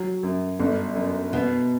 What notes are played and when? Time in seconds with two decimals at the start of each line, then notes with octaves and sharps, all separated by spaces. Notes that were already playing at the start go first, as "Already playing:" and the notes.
Already playing: F#3
0.23 F#2
0.59 G1
0.95 F#2
1.33 B2 B3